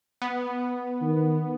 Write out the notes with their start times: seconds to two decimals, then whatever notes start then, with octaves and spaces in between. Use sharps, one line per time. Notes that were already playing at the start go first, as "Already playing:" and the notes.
0.22 B3
1.02 D#3